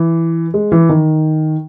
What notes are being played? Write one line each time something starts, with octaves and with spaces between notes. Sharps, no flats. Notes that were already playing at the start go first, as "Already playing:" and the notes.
Already playing: E3
G#3
E3
D#3